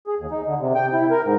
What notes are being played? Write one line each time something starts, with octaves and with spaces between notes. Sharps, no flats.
G#4
D#2
D#4
D3
C3
G5
E4
A#4
G#2